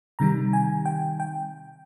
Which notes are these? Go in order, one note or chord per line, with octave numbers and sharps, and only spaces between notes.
C3 D#3 G3 A#5
G#5
G5
G5